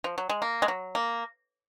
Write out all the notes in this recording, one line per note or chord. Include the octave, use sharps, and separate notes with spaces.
F3
F#3
G#3
A#3
G#3
F#3
A#3